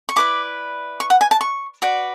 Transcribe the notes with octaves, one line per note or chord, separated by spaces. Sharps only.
C#6
E4 B4 D5 D6
C#6
F#5
G#5
A5
C#6
F#4 B4 D5